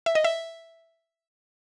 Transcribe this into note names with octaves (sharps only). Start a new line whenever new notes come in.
E5
D#5
E5